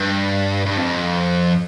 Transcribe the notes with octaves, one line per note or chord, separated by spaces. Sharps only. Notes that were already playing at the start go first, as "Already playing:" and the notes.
Already playing: G2
G2
F2